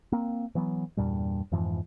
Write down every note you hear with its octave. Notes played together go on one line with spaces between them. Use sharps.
A#3 C4
E3 F#3 B3
E2 G2 A#2 G3
F2 G#2 E3 F3